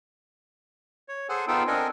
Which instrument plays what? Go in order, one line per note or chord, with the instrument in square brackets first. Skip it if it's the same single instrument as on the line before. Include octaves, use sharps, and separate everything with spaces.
[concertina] C#5
G#4 A4 C5 F#5 G#5
B3 D#4 F4 A4 C5 G5
C4 D4 A4 A#4 D#5 G#5